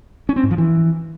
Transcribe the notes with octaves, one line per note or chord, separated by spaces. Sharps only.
C#4
C4
G#2
F3
E3